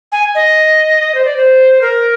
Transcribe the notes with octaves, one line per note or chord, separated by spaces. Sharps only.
G#5
D#5
C5
D5
C5
A#4